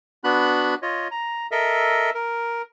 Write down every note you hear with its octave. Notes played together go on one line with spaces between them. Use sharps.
B3 D4 F#4 B5 F#6
F4 C#5 D#5
A#5
A4 A#4 D#5 E5
A#4